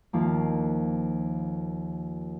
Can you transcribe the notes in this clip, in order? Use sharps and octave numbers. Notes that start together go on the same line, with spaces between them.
D#2 F3 A#3